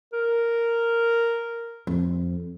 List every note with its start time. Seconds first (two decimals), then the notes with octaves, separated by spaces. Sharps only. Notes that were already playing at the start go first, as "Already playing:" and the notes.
0.13 A#4
1.87 F2